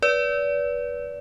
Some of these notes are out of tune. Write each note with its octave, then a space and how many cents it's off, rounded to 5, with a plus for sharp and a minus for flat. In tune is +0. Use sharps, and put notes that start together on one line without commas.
B4 -20 D5 -30